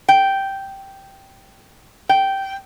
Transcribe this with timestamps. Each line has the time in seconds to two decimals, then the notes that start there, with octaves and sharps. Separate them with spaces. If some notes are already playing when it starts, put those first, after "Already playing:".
0.09 G5
2.09 G5